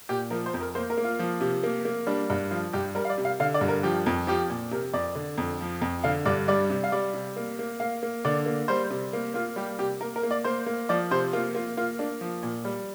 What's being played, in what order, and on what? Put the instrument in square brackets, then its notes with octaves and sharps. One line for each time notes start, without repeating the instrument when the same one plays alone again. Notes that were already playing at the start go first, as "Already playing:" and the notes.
[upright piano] A#2 G4
F3 A#4
C5
F2
A#4
A#3 C5
A#4
A#3
F4
F3
C3
A#3
A#3
G3 D4
G2
F3 F4
G2 G4
G3 A#4
F5
D5
C3
F5
D3 F5
D5
G2
A#4
F3 G4
F2
F3 G4
A#2
C3 A#4
F2 D5
D3
F2
F3
F2
D3 F5
G2 D5
G3 D5
C3
F5
G3 D5
C3
A#3
A#3
A#3 F5
A#3
D3 D5
A#3
G3 C5
C3
A#3
A#3 F4
G3 G4
C3 G4
A#3 A#4
A#4
A#3
D5
A#3 C5
A#3
F3 D5
C3 C5
A#3 F4
A#3 F4
A#3 F4
A#3 D4
F3
A#2
G3